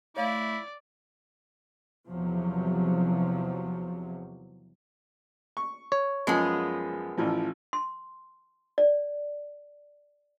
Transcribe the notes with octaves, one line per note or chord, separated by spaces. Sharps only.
A3 E4 C#5 D5 F5
E2 C3 F3 F#3
C#6
C#5
F#2 F3 G#3 B3 G#4
A1 E3 F3
C6
D5